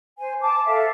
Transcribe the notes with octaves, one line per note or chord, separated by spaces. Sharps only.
C5 G#5
A5 D6
A4 E5 F5